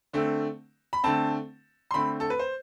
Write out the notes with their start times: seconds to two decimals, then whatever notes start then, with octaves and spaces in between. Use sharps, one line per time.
0.13 D3 A3 C4
0.93 B5
1.04 D3 A3 C4 A5
1.91 C6
1.94 D3 A3 C4 B5
2.20 A4
2.30 B4
2.39 C5